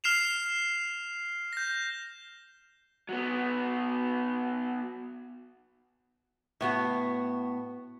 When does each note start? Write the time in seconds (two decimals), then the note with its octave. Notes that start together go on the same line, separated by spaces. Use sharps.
0.04 F6 C7 E7 F7
1.53 G6 A#6
3.09 F#3 B3
6.61 A2 B3 F#4